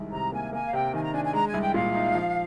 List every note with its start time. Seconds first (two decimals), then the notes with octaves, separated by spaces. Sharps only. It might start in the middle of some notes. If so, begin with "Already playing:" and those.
Already playing: C2 D#3 G#3
0.12 C3 A#5
0.32 A#3 G#5
0.53 A#3 G#5
0.66 F5
0.73 C3 G5
0.93 D#3 G#5
1.03 A#5
1.14 D4 G#5
1.24 G#5
1.33 G#3 A#5
1.48 G#5
1.54 C2
1.61 G5
1.74 A#2 F5
1.94 D#4
2.15 F3